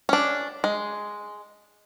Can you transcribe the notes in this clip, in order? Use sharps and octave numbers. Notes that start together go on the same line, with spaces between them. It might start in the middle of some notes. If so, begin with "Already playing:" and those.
C#4 D4
G#3